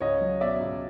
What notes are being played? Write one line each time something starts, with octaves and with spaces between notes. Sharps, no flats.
C#2 C#5 D#5
F#3
B2 D5 E5
C#2